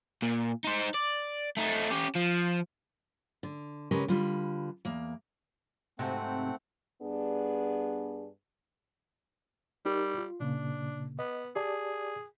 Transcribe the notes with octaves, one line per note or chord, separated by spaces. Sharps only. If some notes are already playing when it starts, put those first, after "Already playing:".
A#2
D#4 C5
D5
A3 D#4
C#4 G4
F3
D3
C#3 G#3 C#4 G4 A#4 B4
D3 G3 F4 B4
E2 A#3
G#2 C3 F#3 A3 C4 F#5
G2 B3 D4 G#4
G3 D#4 G4 A#4
F4
A#2 C#3 A#3 D4
B3 D#5
G4 G#4 D5 A5